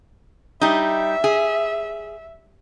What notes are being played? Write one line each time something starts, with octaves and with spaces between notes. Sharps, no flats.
G3 D#4 E5
G#4